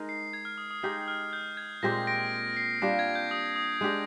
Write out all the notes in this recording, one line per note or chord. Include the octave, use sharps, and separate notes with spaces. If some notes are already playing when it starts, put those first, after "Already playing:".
Already playing: G#3 D#4 A#4
C7
G#6
F6
D#6
D#6
G#3 D#4 G4 D#6
F6
G6
G#6
A#2 G#3 C4 G4 A#6
A#6 D7
C7
G3 D4 F4 A#6
G#6
G6
D#6
D#6
G#3 D4 G4